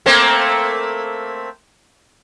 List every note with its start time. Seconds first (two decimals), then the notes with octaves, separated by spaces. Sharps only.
0.06 A3 A#3 C4